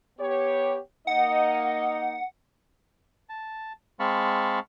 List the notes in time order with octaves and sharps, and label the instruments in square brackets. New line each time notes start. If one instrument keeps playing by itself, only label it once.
[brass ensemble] B3 G4 C#5
[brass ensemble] A#3 D#4 D#5 [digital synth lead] F#5
[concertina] A5
G#3 C4 F5 A5 B5 C#6